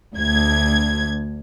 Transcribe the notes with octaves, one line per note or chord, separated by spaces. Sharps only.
D2 G#6